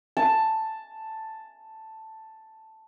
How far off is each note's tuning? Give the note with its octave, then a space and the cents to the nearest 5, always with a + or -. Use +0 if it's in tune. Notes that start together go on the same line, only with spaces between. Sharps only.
A5 +5